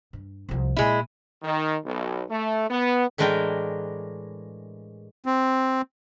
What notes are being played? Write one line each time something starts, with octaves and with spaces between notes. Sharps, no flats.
G2
C2 F3
A#2 G#3 E4
D#3
B1
A3
B3
A2 E3 G#3 D4 A#4 G5
C4